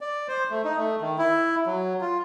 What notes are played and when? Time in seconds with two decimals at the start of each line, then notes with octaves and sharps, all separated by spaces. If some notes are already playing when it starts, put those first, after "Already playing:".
0.01 D5
0.28 C5
0.50 A3
0.65 D#4
0.77 A3
1.01 D#3
1.18 E4
1.66 F#3
2.01 F4